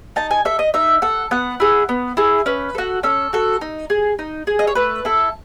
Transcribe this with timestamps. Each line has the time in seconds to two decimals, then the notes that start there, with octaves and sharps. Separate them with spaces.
0.16 D#4 A5
0.31 G#5
0.45 A4 E5
0.59 D#5
0.74 D#4 E5
1.02 A4 F#5
1.31 B3 F#5
1.60 E4 G#4
1.89 B3
2.17 E4 G#4
2.46 C#4 B4
2.75 F#4 A4
3.03 C#4 A4
3.33 F#4 A4
3.61 D#4
3.90 G#4
4.19 D#4
4.47 G#4
4.59 D#5
4.67 C#5
4.75 A3 B4
5.05 E4 A4